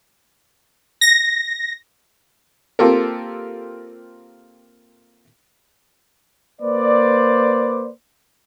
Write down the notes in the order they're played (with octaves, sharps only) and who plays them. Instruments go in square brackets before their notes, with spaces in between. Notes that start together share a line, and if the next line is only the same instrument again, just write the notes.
[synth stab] A#6
[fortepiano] A#3 C4 F4 G4 A4 A#4
[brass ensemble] A#3 B4 C5 D5